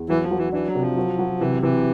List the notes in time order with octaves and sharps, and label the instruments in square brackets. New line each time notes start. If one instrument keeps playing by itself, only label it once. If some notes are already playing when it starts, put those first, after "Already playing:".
Already playing: [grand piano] E2
[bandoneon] E3 [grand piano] F#3
[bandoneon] F3
[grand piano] F#3
[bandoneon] E3
[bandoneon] E3 [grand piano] D4
[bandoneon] F#3
[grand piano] C3
[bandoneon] F3
[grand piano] F#3
F#3
[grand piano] C3 [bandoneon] E3
[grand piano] C3 [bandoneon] E3